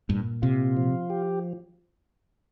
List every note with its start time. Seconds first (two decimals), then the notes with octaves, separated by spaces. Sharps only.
0.09 G2 A#2
0.42 C3 F4
0.77 F3
1.10 G4